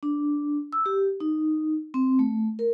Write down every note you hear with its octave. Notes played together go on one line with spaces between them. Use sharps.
D4
E6
G4
D#4
C4
A3
A#4